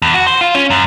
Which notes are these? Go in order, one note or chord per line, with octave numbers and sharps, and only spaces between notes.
E2
F#4
C5
F4
C#4
F#2